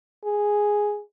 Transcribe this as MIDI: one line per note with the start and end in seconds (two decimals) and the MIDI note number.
0.25 1.01 68